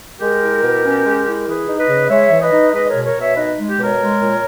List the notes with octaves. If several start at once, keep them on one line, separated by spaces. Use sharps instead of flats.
G#3 G4 A#4
E4
B2
C#4
G#3
E4
E3 G#4 B4
D#4
B4 D#5
C#3
G#3 C#5 E5
E3
B4 D#5
D#4
G#3 B4 D#5
B2 A#4 C#5
A#4 C#5
B2
C#5 E5
D#4 B4 D#5
G#3
G4
B2
A#4 C#5
G#3
A#2